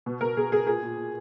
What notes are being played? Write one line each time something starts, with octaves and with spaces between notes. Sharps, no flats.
B2
B2 A#4
B2 G#4
B2 G#4
A#2 G#4
A#2
A#2